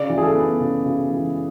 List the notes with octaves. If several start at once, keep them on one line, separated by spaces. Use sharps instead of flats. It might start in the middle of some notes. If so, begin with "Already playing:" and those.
Already playing: C#3 D5
E3
G#4
A4
B3
C#3
C#3
E3